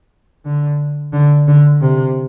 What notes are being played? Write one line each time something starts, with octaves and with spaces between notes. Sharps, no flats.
D3
D3
D3
C3